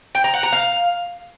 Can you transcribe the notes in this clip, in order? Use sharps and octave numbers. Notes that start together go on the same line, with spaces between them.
G5
A#5
F#5
A#5
F5